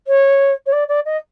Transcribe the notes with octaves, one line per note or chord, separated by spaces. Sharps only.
C#5
C#5
D5
D5
D#5